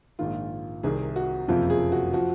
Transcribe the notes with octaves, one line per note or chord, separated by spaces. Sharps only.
A#1 G#2 D#3 F4
C2 C3 D#3 G#4
F#4
F#1 F2 C3 F3 F4
G#4
F#4
F3 F#4